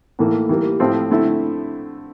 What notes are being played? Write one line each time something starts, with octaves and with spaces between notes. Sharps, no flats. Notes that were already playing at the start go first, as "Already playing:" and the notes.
A2 E3 A#3
E3 G3 A#3
A2 F3 C4 E4
D3 A3 C4 E4